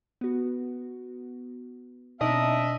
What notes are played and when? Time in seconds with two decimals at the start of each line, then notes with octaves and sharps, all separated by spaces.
0.21 B3 F#4
2.21 B2 C4 D4 D#4 D#5 E5